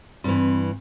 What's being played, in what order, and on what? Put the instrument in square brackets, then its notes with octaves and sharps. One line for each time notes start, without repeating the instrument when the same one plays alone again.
[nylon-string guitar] G2 E3 [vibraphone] C4